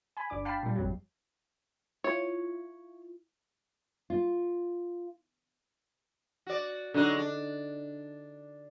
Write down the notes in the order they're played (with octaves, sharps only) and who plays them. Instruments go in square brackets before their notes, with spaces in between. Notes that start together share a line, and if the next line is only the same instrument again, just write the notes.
[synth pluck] G#5 B5
G1 D4 D6
F5 G5 A5 B5 C7
A#2 G3
G#1 F2 F#3
[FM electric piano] E4 F4 [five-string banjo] C#5
[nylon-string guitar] F4
[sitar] F#4 D5
[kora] D3 [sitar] F#3 G#3 D#4
[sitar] D4